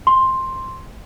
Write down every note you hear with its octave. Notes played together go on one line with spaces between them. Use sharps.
C6